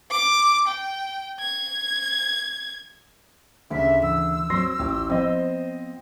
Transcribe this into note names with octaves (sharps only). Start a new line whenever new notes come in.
D6
G5
G#6
D2 C#3 G4 A4 D5 E5
E3 E6
F#3 C4 C6 A#6 C7
A1 F4 G5
F3 B3 C4 C5 D#5